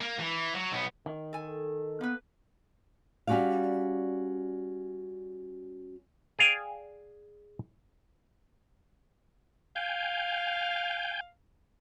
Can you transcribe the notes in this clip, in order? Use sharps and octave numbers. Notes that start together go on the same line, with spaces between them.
A#3
E3
F#3
B1 B3
D#3
A4 G#5
A#3 B3 B4
G3 C#4 F#4 D5 F5
G#4 D5 F5 G5 G#5
F5 G5 G#5 G6